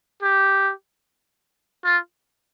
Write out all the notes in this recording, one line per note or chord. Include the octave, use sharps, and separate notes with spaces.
G4
F4